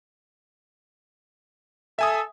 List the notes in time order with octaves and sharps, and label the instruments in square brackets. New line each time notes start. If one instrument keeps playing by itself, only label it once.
[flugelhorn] A4 [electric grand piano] E5 G#5 D#6